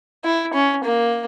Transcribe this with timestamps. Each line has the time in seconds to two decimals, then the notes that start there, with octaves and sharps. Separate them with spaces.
0.24 E4
0.54 C#4
0.84 A#3